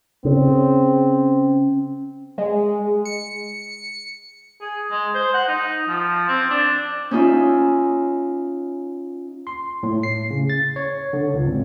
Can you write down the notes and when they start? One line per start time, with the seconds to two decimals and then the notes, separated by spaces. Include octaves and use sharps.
0.25 C#3 C4
2.38 G#3
3.05 C#7
4.62 G#4
4.91 G#3
5.15 C5
5.34 F#5
5.48 D#4
5.88 F3
6.29 C4
6.50 D4
7.11 C#4 D#4 F4 E5
9.47 C6
9.83 A2
10.03 C7
10.30 C#3
10.50 A6
10.76 C#5
11.13 D3
11.34 C#2
11.46 G#1